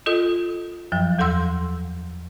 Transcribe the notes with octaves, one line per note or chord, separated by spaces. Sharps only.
F4 A4 D#5 D#6
F#2 F3 F#3
E2 A4 F#5 C6 E6